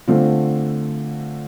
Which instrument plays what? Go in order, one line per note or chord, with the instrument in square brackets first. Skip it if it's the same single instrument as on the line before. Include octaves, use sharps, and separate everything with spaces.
[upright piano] D3 [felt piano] A3 C4 F4